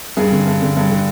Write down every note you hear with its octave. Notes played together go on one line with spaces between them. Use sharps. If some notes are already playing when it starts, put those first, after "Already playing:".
G2 G#4
D3
G2
D3
G2
D3